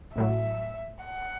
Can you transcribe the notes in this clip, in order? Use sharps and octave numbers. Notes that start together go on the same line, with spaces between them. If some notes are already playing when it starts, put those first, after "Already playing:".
A1 A2 F#3 E5
F#5